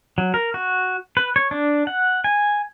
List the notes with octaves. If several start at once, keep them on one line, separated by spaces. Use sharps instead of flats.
F#3
A#4
F#4
B4
C#5
D4
F#5
G#5